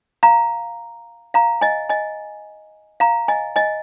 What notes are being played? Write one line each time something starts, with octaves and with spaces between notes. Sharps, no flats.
F5 A#5
F5 A#5
D#5 G#5
D#5 G#5
F5 A#5
D#5 G#5
D#5 G#5